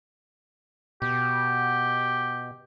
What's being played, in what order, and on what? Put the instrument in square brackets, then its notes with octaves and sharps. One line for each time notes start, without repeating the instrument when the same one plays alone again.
[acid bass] B2 [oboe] G4